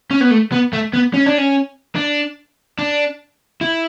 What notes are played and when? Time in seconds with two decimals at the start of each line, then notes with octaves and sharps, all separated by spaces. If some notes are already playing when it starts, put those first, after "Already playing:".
0.11 C#4
0.21 B3
0.31 A3
0.52 B3
0.73 A3
0.93 B3
1.14 C#4
1.26 D4
1.38 C#4
1.96 D4
2.79 D4
3.61 E4